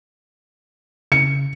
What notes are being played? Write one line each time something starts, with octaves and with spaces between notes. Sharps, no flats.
C#3 C#7